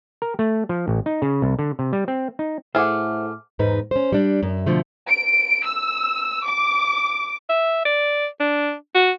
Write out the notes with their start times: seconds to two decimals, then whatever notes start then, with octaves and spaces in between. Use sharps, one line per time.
0.22 A#4
0.39 A3
0.69 F3
0.88 A1
1.06 D#4
1.22 C#3
1.42 C2
1.59 D3
1.79 C3
1.93 G3
2.08 C4
2.39 D#4
2.75 A2 A3 G#4 C5 E5 F#5 D6 F6
3.59 E2 G#2 D#4 B4
3.91 C#4 C5
4.12 G3 D4
4.43 F#2
4.66 B2 D3 F3 A3
5.08 D7
5.65 E6
6.45 D6
7.49 E5
7.85 D5
8.40 D4
8.95 F#4